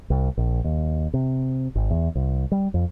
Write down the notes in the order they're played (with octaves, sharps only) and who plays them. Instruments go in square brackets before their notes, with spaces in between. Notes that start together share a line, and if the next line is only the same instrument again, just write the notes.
[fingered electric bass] C2
A#1
D#2
C3
G#1
E2
C2
G3
F2